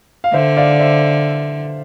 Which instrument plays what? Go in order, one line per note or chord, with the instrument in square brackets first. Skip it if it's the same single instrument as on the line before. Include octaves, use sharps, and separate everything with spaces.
[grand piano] F5
[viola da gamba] D3 [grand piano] C5 E5
[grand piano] D5 F5
C5 E5